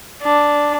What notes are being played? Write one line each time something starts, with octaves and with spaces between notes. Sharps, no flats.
D4